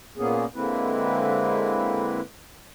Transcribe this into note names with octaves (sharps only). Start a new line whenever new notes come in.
A#2 A#3 B3 C#4 G#4
D3 G#3 A#3 C4 E4 B4